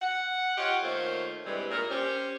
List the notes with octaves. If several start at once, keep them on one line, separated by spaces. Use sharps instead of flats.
F#5
F4 G4 C#5 D#5 F5 F#5
D#3 A3 A#3 F4 C5 C#5
G2 C3 E3 G3 G#3 B4
A#2 A#4
C#4 G4 C5